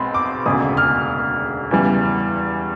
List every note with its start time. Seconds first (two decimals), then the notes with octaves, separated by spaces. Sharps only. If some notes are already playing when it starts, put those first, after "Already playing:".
Already playing: B1 B2 G#3 C4 B5 C6
0.14 D6
0.46 E1 D2 C#3 D#6
0.77 F6
1.71 E2 C#3 E3 G3